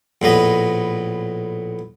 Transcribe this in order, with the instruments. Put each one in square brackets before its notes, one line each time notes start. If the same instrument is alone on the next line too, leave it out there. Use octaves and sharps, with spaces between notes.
[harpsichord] A#1 A2 B3 D#5